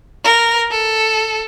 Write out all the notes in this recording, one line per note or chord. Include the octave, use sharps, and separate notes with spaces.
A#4
A4